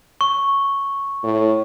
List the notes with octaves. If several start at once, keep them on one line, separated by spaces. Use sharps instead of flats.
C#6
A2